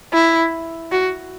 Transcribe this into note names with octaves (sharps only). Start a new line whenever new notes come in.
E4
F#4